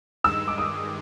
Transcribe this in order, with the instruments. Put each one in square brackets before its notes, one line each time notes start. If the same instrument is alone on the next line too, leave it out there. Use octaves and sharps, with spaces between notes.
[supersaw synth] G2 D#3 G#3 [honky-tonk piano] E6
[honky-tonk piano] D6
D#6